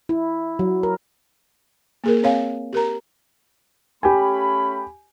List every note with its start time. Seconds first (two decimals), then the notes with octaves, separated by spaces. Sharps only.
0.09 E4
0.59 F#3
0.83 A#4
2.04 A#3 G#4 A#4
2.23 C4 C#5 F5 G#5
2.73 G4 A#4 A#5
4.03 A3 C#4 G4 G#5 B5